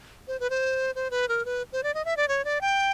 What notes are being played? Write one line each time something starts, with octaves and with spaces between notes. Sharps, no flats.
C5
B4
C5
C5
B4
A#4
B4
C5
D5
D#5
E5
D5
C#5
D5
G5